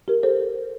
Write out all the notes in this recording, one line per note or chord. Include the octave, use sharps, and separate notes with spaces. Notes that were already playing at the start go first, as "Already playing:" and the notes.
G4 A#4
A4 C5